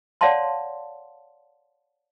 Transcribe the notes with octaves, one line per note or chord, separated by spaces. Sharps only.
C#5 D5 F5 F#5 A5 C6